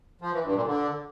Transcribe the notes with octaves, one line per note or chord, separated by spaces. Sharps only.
F3
E3
G2
A#2
D3